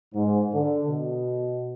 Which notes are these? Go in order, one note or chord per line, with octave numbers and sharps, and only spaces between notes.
G#2
D3
B2